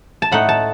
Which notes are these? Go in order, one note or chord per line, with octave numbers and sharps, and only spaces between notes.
A5
A2 A3 D#4 F#5
A5